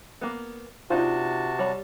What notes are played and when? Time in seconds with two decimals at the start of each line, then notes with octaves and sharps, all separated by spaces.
0.21 A#3 B3
0.90 C3 D4 D#4 F4 F#4 C5 A5
1.59 G3 C#5 B5